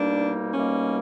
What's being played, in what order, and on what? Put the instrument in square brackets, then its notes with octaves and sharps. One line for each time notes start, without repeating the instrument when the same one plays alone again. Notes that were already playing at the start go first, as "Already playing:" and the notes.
Already playing: [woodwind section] C2 B2 G3 A#3 D#4 [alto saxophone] D4
[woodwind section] C2 B2 G3 A#3 D#4 [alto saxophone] C#4